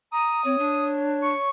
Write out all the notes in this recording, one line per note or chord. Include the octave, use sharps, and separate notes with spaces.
A#5 D#6
C4 C#5
D4
C#6